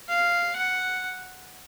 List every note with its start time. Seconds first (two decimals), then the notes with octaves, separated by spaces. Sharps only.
0.09 F5
0.56 F#5